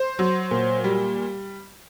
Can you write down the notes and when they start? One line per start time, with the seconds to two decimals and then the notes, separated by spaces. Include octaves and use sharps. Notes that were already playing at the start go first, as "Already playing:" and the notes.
Already playing: C5
0.19 F#3
0.51 A#2
0.84 G3